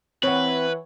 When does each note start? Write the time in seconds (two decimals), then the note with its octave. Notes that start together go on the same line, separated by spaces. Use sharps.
0.23 E3 C4 B4 C#5 F#5